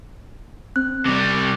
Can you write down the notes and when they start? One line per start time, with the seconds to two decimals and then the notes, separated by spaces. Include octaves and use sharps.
0.76 C4 F#6
1.05 C3 G3 D6